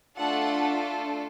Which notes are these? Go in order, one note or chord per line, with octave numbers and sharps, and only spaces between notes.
A3 D4 F4 A4 F#5